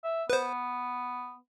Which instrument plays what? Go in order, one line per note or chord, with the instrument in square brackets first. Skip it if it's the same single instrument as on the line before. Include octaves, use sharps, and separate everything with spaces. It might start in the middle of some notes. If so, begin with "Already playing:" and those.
[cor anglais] E5
[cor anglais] B3 [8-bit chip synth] B4 C5